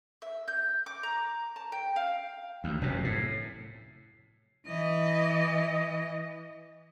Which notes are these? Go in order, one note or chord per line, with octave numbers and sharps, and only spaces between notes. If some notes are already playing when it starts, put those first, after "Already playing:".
E5
G6
D6
A#5
A5
G5
F5
D2
F1 F#2 C3
A2
E3 D#5